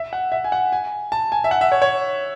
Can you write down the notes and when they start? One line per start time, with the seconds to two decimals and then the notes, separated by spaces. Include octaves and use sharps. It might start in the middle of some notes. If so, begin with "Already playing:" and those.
Already playing: E5
0.13 F#5
0.32 E5
0.44 G#5
0.52 F#5
0.72 G#5
1.12 A5
1.32 G#5
1.44 E5
1.51 F#5
1.61 E5
1.72 C#5
1.82 C#5